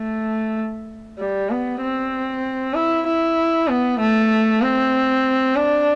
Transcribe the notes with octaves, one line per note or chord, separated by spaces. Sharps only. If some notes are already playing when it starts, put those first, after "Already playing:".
Already playing: A3
G3
B3
C4
E4
E4
B3
A3
C4
D4